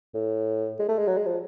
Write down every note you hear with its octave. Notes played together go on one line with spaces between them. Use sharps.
A2
G#3
A3
G#3
F#3
G#3
F3